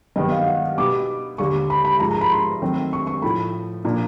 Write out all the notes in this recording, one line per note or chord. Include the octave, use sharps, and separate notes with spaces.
G2 D#3 F#3 B3 D#5
F5
F#5
B2 G3 B3 D#4 G4 D6
D#2 D3 G3 C#6
B5
B5
G#2 F3 G#3 A#5
A#5
B5
C6
D#3 F#3 A3 C4
C#6
C#6
A2 F3 A3 B5
A#2 F3 A#3 D4 A#5